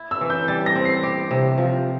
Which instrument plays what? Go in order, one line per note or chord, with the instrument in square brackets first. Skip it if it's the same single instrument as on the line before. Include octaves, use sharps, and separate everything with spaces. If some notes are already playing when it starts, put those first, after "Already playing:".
Already playing: [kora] E4
[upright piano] E6
[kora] E3
[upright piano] G6
[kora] G3 [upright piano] A6
[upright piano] A#6
[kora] C4
[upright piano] C7
[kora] G4
C3
F3